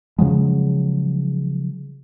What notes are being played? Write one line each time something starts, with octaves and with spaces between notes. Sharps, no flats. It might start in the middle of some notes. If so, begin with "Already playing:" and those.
C#3 F3 F#3 G#3